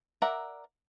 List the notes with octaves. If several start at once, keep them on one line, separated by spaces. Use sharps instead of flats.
A#4 D5 E5 F#5 A#5